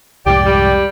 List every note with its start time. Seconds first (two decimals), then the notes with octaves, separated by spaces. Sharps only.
0.26 C2 F2 G#2 G4 D5 G5
0.45 G3